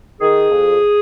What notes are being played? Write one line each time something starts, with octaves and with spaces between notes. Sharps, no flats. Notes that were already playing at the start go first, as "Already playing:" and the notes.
D#3 G#4
F2